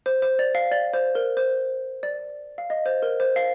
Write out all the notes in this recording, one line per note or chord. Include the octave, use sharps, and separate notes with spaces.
C5
C5
D5
F5
D5
C5
A#4
C5
D5
F5
D#5
C5
A#4
C5
F5